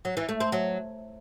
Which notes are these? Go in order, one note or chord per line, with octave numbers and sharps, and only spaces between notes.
F#3
E3
A3
C4
F#3